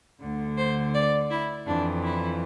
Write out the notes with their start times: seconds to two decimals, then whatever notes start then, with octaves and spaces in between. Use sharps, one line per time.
0.21 D2 D3
0.57 C5
0.94 D5
1.30 E4
1.66 F2 E3 D4
2.03 E4